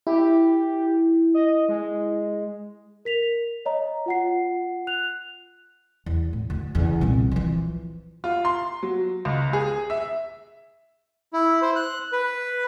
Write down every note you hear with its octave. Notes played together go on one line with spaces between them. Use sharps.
E4 G4
D#5
G#3
A#4 B6 F7
C#5 D#5 A#5
F4 F#5 C7
F#6 F7
E2
A2
D2
E2 C#3
C2 A#2
E3 F3
F4
C6
F#3
C#2
G#4
E5
E4
C5
F#6
B4